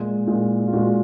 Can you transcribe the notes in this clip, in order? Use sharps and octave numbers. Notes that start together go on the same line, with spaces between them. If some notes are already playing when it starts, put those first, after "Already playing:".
Already playing: A#2 G#3
A#2 G#3
F4
A#2 G#3 F#4